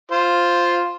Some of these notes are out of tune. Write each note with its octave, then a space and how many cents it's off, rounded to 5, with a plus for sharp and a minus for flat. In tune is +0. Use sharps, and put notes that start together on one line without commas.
F4 +0 C5 +0